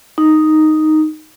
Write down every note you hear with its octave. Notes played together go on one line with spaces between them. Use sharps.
D#4